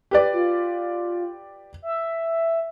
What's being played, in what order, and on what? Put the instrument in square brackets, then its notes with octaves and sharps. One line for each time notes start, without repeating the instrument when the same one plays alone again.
[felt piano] G4 B4 D5
[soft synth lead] F4
E5